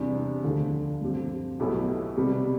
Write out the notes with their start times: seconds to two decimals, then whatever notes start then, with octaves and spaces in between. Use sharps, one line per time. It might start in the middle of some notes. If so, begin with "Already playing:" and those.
Already playing: E2 C3 G3 D4
0.44 D2 D3 F3
1.01 G2 F3 C4 G4
1.60 B1 B2 A3 E4 G4
2.17 C3 G3 B3